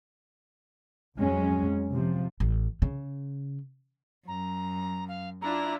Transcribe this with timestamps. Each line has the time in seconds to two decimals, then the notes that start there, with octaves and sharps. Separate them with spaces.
1.19 F2 F#3 G#3 C#4
1.91 C3 F3
2.40 A1
2.82 C#3
4.27 F#2 A#5
5.08 F5
5.41 D4 E4 F4 A#5